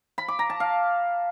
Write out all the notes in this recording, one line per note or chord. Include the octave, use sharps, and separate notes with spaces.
B5
D6
A#5
A5
F5